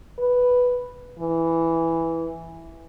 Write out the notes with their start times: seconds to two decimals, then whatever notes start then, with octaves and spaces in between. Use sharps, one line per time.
0.19 B4
1.19 E3